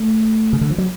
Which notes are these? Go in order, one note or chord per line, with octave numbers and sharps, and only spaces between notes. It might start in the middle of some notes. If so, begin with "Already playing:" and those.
Already playing: A3
C#3
D3
F3
F#3